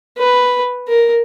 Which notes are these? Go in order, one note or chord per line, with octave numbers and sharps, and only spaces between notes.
B4
A#4